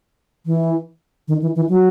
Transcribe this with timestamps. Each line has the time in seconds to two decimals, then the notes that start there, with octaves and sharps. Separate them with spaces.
0.46 E3
1.28 D#3
1.42 E3
1.56 E3
1.69 F#3